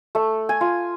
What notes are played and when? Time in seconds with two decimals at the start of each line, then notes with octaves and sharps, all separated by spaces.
0.15 A3
0.49 G#5
0.61 F4